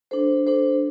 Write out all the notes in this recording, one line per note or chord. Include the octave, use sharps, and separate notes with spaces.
D4 A4 C5
D4 A4 C5